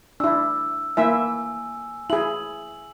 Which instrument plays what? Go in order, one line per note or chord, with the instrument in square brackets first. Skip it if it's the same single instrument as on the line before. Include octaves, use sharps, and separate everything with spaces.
[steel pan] D4 E4 [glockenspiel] E6
[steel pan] A#3 E4 E5 [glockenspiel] G#5
[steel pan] E4 G#4 [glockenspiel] F#7